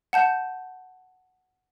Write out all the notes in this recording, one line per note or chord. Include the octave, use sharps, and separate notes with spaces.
F#5 A5 G6